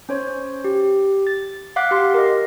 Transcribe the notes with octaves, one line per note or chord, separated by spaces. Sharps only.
C#4 C5 C#5
G4
A6
F5 F#5 D6 F#6 B6
G4 C6 D6
A#4 D#5